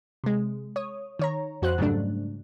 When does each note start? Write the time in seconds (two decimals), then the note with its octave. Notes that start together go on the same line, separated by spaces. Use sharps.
0.24 C3 G#3
0.76 C#5 D#6
1.19 D#3 C#5 A#5
1.62 F2 F#4 C5 F#6
1.78 G#2 C#3 F#3 G3 A3 D4